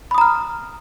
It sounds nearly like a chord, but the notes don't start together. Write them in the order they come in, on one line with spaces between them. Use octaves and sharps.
B5 D#6 A#5 F6